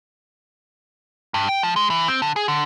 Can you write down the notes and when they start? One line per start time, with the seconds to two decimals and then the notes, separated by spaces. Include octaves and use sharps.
1.34 G2
1.49 G5
1.63 F3
1.76 G#3
1.90 E3
2.08 C4
2.22 D3
2.36 G#4
2.48 D3